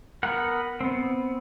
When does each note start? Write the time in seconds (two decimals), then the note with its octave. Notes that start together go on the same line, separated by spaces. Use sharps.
0.23 B3 A#4 F#5
0.81 B3 C4